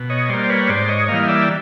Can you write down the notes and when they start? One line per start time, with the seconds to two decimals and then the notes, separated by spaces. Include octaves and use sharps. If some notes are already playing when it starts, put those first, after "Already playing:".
Already playing: B2
0.10 C#5 D#5
0.29 G3 A#3 C5 D5
0.49 B4 C#5
0.69 G#2 C5 D5
0.89 C#5 D#5
1.08 E3 G3 A#3 D#5 F5
1.23 D#5
1.28 D5 E5